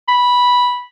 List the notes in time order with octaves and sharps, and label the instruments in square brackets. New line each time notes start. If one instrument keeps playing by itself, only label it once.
[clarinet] B5